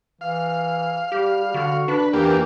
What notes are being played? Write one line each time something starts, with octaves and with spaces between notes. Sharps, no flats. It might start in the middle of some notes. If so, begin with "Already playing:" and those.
E3 F5
G3 G4
D3 F#4
D4 B4
E2 E3 A#3 G4